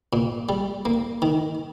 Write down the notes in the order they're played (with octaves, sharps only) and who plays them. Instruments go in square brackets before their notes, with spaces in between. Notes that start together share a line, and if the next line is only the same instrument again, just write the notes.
[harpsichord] A#2
G3
A#3
D#3